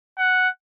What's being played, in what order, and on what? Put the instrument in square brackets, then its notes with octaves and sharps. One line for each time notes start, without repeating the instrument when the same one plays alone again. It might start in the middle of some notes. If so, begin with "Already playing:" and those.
[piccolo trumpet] F#5